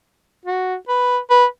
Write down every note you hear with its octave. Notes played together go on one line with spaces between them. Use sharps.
F#4
B4
B4